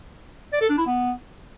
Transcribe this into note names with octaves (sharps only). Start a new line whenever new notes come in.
D5
A4
D4
E4
B3